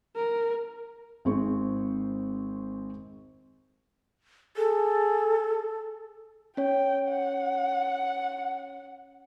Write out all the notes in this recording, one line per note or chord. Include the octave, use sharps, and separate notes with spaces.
A#4
G#1 C4 G#4 C#6
G#4 A4
C#4 C#5 G5
F#5